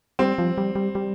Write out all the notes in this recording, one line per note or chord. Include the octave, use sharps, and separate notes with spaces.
G3 C4
F3
G3
G3
G3